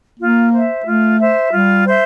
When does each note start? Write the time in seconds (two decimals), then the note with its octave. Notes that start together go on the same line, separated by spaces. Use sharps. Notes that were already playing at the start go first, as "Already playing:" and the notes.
0.20 A#3 F4
0.52 C5 E5
0.86 A3 F4
1.20 C5 E5
1.52 G3 F4
1.86 C5 E5